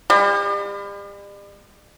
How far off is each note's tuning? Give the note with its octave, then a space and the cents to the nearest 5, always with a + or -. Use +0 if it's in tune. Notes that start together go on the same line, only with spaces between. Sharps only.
G3 +40